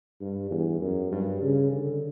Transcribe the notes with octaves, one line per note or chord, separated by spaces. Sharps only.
G2
E2
F#2
G2
C#3
D3